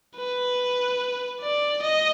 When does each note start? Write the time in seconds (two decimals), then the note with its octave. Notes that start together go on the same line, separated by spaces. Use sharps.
0.17 B4
1.41 D5
1.82 D#5